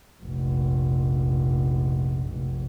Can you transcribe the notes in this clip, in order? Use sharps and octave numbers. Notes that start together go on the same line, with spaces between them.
F1 A#1